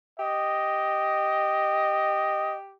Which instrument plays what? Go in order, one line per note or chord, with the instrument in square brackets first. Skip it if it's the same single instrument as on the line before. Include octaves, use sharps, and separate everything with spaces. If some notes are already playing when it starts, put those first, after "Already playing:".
[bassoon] G4 [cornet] D#5